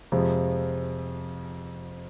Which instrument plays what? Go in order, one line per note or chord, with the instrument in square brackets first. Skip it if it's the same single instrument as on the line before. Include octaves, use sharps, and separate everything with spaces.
[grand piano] F2 C3 F3 G#3